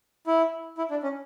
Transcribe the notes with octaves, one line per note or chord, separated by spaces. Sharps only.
E4
E4
D4
C#4